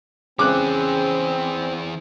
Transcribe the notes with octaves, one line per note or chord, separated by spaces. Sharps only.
C#3 E3 C4 G#4 D6 F#6